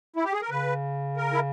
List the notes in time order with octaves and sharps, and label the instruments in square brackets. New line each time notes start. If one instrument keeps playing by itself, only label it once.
[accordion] E4
G4
G#4
A#4
[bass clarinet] C#3 [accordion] B4
[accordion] A#4
E4